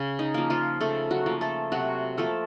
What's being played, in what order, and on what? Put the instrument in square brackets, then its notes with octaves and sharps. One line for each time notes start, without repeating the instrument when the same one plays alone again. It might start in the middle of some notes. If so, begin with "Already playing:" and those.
Already playing: [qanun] C#3
D#4
F3 A#3
F3 F4
C#3 A3 A4
F#3 F#4
F3 A#3
A3 A4
C3 F#3 F#4
F3 A3 A#3 A4